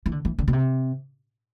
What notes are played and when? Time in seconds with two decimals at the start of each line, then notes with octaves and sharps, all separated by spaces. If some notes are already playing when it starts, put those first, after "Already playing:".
0.06 E3
0.12 D3
0.25 E3
0.38 D3
0.48 B2
0.53 C3